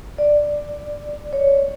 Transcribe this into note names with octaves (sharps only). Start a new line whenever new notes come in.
D5
C#5